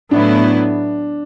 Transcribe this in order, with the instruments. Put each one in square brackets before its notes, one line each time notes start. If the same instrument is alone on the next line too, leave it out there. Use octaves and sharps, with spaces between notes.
[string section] A2 F#3 B3 E4 [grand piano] D4